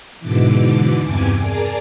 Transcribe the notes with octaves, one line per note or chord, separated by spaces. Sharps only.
G#2 B2 D3 E3 D6
E2 G2 C3 G#5 D6
G#4 A#4 D5 G#5 A5 D6